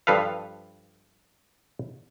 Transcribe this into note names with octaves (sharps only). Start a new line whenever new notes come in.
G2 F3 A4 B4 F5